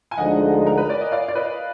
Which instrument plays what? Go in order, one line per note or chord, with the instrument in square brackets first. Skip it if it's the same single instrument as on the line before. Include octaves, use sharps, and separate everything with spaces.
[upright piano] G#5
[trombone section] D2 D3 F3 G#3 D#4 [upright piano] D#5 F#5
[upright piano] A#4
B4
D5
D#5
D5 F5
D5
B4 D#5